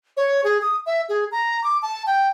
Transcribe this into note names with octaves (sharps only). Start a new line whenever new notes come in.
C#5
G#4
D#6
E5
G#4
A#5
D6
A5
G5